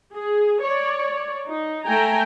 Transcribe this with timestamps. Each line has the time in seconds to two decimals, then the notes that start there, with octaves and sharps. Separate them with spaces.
0.13 G#4
0.61 C#5 D5
1.47 D#4
1.85 A3 G5 G#5 A#5